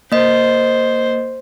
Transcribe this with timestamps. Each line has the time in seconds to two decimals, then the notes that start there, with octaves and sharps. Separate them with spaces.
0.12 A#3 C5 D#5